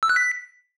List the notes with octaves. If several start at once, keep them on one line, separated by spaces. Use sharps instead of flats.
E6
F#6
B6